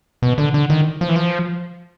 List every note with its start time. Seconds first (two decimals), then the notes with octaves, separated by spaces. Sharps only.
0.22 B2
0.38 D3
0.54 D3
0.70 D#3
1.01 F3
1.09 E3
1.16 F3